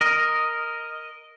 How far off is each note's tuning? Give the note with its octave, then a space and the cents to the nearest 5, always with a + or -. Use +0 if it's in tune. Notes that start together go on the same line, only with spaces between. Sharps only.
A#4 +0 D#5 +0